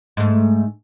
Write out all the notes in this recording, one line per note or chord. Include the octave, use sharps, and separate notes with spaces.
G#2 A3